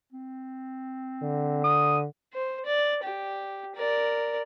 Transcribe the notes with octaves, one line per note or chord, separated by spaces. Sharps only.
C4
D3
D#6
C5
D5
G4
A#4 D5